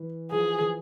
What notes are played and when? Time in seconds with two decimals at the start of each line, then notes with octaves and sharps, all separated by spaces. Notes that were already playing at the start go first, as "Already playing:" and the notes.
Already playing: E3
0.31 F3 G#4
0.60 E3